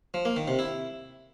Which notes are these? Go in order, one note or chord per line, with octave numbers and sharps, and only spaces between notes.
F3
A#3
D#3
C3
E4